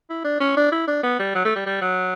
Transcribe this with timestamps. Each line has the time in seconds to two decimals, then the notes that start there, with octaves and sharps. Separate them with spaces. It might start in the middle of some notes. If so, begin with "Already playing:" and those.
0.10 E4
0.25 D4
0.40 C#4
0.57 D4
0.72 E4
0.88 D4
1.03 B3
1.19 G3
1.35 F#3
1.45 A3
1.56 G3
1.66 G3
1.81 F#3